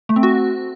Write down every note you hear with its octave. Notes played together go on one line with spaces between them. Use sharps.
A3
C4
F#4